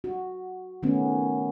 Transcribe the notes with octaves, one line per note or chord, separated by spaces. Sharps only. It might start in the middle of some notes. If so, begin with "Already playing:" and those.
F#4
D#3 A3 B3 C#4